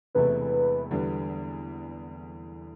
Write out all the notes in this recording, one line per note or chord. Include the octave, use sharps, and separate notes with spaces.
E1 E2 C3 E3 A3 B4
E2 D3 G3 B3